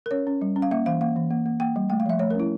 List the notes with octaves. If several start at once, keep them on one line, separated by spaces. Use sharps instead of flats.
A#4
C#4 C#5
C#4
G3
C#4
F5
A#3 E5
E3 F5
A#3 F5
E3
A#3
A#3
A#3 G5
G3
A3 G5
F5
F3 E5
A3 C#5
A#4
C#4 E4